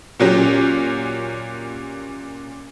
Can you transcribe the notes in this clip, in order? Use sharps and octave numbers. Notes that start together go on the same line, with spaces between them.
A#2 F#3 C#4 G4